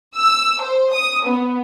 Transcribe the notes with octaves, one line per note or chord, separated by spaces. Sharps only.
E6
C5
D#6
B3